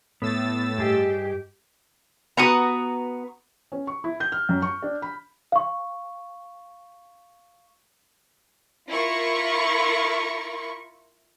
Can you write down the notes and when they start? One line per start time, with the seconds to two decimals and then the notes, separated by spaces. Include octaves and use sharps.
0.22 A2 A3 B3 E6 A6
0.78 G2 G4 G#4 D#5
2.37 B3 F#4 B4 A#5 C#6 D#6
3.72 C#4
3.87 C#6
4.04 E4
4.20 G6
4.32 F6
4.49 F#2
4.62 C#6
4.82 D4
5.02 B5
5.52 F5 C#6
8.89 E4 F4 A#4 C#6